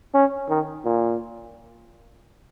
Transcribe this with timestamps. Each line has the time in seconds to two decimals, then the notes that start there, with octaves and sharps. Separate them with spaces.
0.14 C#4
0.49 D#3
0.85 A#2